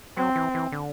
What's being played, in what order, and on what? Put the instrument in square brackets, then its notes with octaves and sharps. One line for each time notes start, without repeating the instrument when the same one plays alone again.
[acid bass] F#3 [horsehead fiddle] C4
[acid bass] E3
E3
D3